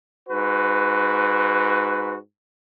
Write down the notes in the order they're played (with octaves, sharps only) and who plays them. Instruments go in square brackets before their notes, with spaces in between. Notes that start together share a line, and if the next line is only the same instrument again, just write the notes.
[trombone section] G#2 F#4 B4